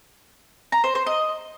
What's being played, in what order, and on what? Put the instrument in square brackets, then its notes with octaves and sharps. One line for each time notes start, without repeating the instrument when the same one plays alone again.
[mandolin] A#5
C5
C5
D#5